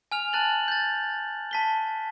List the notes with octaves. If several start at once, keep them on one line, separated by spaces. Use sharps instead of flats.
G#5 F6 F7
A5 F#6 A6 F#7
G6 A6
A5 B6 G7